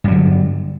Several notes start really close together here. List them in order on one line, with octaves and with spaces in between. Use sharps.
G2 F#3 D3